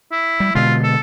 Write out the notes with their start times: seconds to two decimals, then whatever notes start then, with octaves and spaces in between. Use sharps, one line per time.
0.12 E4
0.40 G3
0.55 B2 D3 G#3 F4
0.84 A4